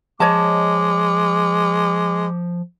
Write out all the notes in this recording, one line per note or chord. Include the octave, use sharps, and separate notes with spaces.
F3 G#3 C#5 D#5 A5 D6